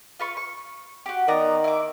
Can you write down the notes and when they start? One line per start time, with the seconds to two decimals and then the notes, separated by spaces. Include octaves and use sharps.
0.19 F4 B4 C#6
0.37 C#6
1.06 F#4 G4
1.28 D#3 B3 D5 A#5
1.64 E4 D6